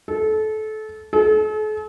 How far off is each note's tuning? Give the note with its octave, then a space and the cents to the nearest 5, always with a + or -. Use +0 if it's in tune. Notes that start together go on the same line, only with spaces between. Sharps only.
A4 -25
A4 -45